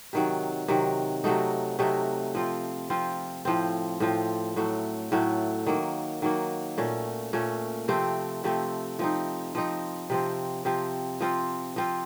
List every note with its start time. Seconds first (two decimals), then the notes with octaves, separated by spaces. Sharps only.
0.13 C3 D#3 F#3
0.68 C3 D#3 F#3
1.24 C3 F#3 A3 D#4
1.79 C3 F#3 A3 D#4
2.35 F3 C4 F4
2.90 F3 C4 F4
3.45 A2 F3 C4
4.00 A2 F3 C4
4.56 A2 F#3 A3
5.12 A2 F#3 A3
5.67 D#3 F#3 A#3
6.22 D#3 F#3 A#3
6.78 A#2 A3 C#4
7.33 A#2 A3 C#4
7.88 C3 F3 A3 C4
8.44 C3 F3 A3 C4
8.99 F3 C4 D#4
9.55 F3 C4 D#4
10.10 C3 F3 C4
10.65 C3 F3 C4
11.21 F3 C4 F4
11.76 F3 C4 F4